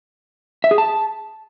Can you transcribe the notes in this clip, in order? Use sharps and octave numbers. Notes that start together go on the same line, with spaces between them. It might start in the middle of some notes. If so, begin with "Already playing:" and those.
E5
G#4
A5